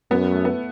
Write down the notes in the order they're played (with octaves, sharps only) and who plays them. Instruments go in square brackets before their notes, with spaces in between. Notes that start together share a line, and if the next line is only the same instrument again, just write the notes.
[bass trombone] F#2 [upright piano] B3
[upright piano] A3
B3